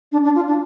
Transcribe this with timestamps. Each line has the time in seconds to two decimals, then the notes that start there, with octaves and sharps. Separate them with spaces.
0.12 D4
0.24 D4
0.35 F4
0.47 D4